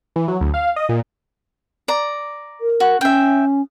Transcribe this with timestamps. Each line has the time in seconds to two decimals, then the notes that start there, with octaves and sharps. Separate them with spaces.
0.16 E3
0.28 F#3
0.41 D2
0.54 F5
0.76 D#5
0.89 A#2
1.88 D5 A#5
2.61 A#4
2.80 F#4
3.01 C#4 E5 G5